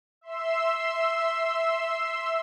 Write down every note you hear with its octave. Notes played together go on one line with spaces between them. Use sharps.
E5 C6 E6